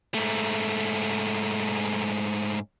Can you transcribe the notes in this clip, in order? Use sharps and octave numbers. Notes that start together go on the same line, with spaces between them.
G#2 A3